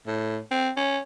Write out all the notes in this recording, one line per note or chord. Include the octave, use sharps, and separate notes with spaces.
A2
C4
C#4